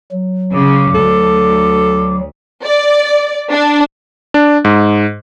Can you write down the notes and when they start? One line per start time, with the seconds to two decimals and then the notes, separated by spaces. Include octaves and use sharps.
0.12 F#3
0.54 C#3 D6
0.94 D2 A4
2.64 D5
3.52 D4
4.34 D4
4.65 G#2